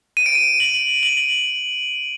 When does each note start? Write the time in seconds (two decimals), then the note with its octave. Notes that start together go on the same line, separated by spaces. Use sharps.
0.17 D#7
0.26 D7
0.35 D#7
0.60 F#7
1.03 F#7